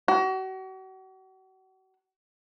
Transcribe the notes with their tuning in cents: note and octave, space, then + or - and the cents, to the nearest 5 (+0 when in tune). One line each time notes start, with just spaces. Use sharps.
F#4 +40